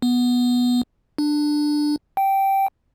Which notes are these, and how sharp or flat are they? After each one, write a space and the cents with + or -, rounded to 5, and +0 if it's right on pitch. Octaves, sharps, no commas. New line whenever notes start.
B3 -10
D4 +15
G5 -10